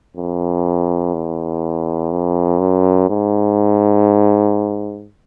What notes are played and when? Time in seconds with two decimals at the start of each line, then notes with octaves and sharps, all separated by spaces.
0.17 F2
1.14 E2
2.11 F2
2.60 F#2
3.09 G#2